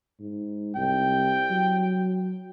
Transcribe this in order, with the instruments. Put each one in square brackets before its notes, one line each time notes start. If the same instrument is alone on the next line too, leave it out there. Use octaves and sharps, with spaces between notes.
[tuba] G#2
[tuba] C2 [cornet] G5
[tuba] F#3